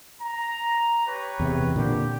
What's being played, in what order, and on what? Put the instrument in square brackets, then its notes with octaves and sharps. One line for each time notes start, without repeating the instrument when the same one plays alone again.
[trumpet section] A#5
G4 B4 C#5
[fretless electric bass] E2 C3
[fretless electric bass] A#2 D3 [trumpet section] G4